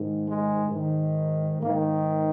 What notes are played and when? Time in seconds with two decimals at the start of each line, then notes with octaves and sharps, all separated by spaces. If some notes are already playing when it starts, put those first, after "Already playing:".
Already playing: G#2 D#3
0.25 G#3
0.71 G#2 D#3
1.61 G#2 D#3 A#3